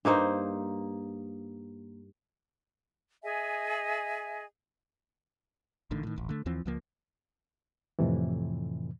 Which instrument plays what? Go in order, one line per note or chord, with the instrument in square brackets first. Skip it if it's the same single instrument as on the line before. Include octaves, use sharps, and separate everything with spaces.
[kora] G2 A#3 D#4 C5
[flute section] G#4 D#5 E5 G#5
[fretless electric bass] A1 A2 D3 D#3
A2 D#3
D#1 A1
D3 A3
D#2 E3 F3 C4
C#2 F3 A#3
[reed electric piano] F2 A2 C3 E3